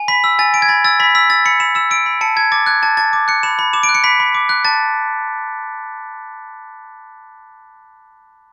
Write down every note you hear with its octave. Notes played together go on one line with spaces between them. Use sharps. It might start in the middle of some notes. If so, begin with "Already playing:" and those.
Already playing: G#5
B5 B6
E6
G#5 A6
G#5 D7
G#6
B5 A6
E6 A6
B5 B6
E6 B6
E6 A6
B5 C#7
B5 E7
E6 E7
E6 D7
B5
A5 C#7
A5 G#6
D6 A6
F#6 G#6
A5 A6
A5 A6
D6
F#6 C#7
B5 E7
B5
D6 E7
D7
F#6
C#7
B5 B6
B5
D6
F#6
A5 A6